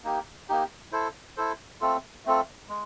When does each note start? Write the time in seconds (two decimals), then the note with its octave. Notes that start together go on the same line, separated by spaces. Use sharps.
0.04 A#3 D#4 G4
0.49 A#3 D#4 G4
0.92 E4 A4 C5
1.37 E4 A4 C5
1.81 A3 C4 F4 A4
2.25 A3 C4 F4 A4
2.69 G#3